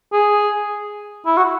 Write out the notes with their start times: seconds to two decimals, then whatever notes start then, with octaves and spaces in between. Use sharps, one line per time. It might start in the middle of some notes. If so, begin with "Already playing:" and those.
0.13 G#4
1.26 E4
1.37 F#4